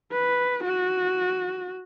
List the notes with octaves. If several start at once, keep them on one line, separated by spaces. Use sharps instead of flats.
B4
F#4